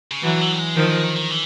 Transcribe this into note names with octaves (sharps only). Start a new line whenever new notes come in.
C#3
D3 E3 F#3
E3
G3
G#3
D#3 F3 A3
G#3
D#3
D#3
E3